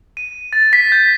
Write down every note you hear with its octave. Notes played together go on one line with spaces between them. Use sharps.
D#7
A6
B6
G6